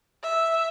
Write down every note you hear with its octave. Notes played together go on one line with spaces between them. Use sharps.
E5